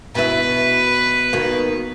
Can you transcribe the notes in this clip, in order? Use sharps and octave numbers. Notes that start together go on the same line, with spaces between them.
B2 E4 B4
B2 D#3 A#3